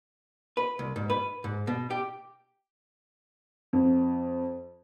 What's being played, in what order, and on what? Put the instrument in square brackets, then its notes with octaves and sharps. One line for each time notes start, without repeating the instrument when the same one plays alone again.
[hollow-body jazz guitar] B4
C2
G#2
B4
G#2
B2
G4
[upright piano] F2